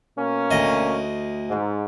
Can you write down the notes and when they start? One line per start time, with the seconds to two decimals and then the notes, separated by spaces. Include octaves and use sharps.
0.16 B2 A#3 C#4
0.51 D2 D#5
1.49 G#2